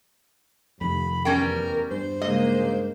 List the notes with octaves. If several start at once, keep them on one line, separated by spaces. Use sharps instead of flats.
F1 F2 D#3 B5
E2 G3 C#4 A#4 G5
G2 C5
C#3 G#3 A#3 D#5